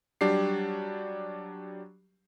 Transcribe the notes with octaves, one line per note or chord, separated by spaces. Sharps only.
F#3 G3 D4 G4 C7